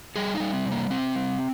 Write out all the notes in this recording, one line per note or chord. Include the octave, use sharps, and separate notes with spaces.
G3 G#4
D#4
G3
C4
C3
A#3
C3 C4
G3